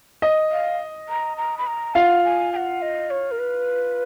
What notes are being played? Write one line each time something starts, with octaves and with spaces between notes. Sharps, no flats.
D#5
F5
A#5
A#5
B5
A#5
F4 F5 F#5
G#5
G#5
F#5
D#5
C#5
A#4
B4